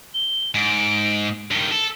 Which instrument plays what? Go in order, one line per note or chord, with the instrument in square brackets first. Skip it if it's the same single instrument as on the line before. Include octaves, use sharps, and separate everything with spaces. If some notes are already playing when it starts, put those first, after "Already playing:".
[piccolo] G7
[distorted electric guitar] G#2 [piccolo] D7
[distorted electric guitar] G2 D#3 [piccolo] G7
[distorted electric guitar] A4